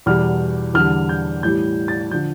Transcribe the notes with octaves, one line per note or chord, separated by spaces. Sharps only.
E2 B2 G3 F6
E2 D3 G3 F6
G6
A2 E3 G3 G6
A6
D3 F3 G6